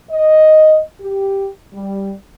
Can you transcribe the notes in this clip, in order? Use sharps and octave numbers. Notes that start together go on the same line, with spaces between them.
D#5
G4
G3